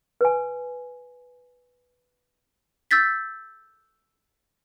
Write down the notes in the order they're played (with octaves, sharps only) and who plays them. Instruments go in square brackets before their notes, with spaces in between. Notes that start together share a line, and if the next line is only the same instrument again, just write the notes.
[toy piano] B4 G#5
[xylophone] E6 G6 A6 B6